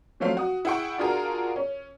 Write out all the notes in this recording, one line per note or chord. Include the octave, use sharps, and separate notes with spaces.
F3 F#3 A3 C4 C#4 F5
F#4 D#6
E4 G#4 F#5 G5 C#6
D4 F4 F#4 G#4 A#4
C#4